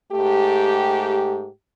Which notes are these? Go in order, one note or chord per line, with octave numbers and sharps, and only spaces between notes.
G#2 A3 G4